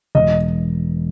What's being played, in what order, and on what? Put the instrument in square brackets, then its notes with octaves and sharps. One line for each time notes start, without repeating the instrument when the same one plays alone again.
[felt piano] E1 [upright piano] D#5